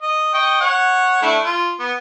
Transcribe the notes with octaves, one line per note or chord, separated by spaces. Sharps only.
D#5
D#5 G5 C#6
C#5 F#5
A3 D4 E4
F4
B3